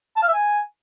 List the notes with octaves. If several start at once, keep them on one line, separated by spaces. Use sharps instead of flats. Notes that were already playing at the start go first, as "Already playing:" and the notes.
A5
F5
E5
G#5